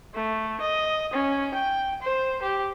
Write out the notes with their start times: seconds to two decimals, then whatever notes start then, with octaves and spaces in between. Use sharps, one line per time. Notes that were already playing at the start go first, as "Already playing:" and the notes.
0.15 A3
0.60 D#5
1.13 C#4
1.54 G5
2.02 C5
2.42 G4